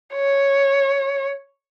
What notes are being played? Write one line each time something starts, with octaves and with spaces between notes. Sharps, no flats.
C#5